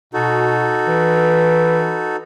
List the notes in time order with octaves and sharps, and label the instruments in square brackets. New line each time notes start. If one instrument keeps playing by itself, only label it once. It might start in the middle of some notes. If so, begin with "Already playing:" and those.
[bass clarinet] B2 [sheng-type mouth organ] D#4 F#4 A4
[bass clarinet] E3